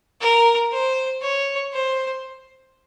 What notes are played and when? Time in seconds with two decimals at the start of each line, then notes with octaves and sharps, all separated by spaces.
0.21 A#4
0.72 C5
1.21 C#5
1.73 C5